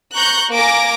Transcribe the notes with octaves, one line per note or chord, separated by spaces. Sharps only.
A#5 C#6 F#6 G6
A#3 G#5 A#5 D6 A#6 D7